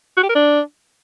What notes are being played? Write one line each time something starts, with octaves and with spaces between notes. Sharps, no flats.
F#4
G4
A#4
D4